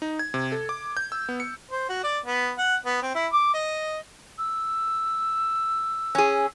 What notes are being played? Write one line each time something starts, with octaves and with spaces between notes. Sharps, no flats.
D#4
G#6
C3
A4
D6
G6
E6
B3
C#7
C5
F#4
D5
B3
F#5
B3
C4
E4
D6
D#5
E6
C#4 G#4